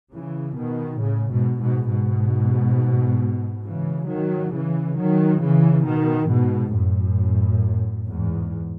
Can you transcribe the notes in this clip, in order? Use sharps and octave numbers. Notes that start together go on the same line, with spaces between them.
C#3 E3
B2 D#3
A2 C#3
G#2 B2
G#2 B2
G#2 B2
C#3 E3
D#3 F#3
C#3 E3
D#3 F#3
C#3 E3
B2 D#3
G#2 B2
F#2 A2
E2 G#2